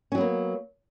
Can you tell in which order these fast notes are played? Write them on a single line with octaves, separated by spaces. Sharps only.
C#4 F#3 B3 A#3